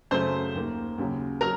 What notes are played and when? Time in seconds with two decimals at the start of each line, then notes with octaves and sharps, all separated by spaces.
0.11 F#2 C#3 F#3 A3 C5 C6
0.54 D#2 D#3 A#3
0.98 D#2 C#3 F#3
1.41 F#3 A#4 A#5